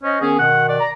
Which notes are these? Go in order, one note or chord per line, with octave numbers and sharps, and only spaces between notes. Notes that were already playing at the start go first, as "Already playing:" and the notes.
C#4 C5 D#5
D#3 B3 C#4 G#4
B2 D#3 F#5
D5
A#5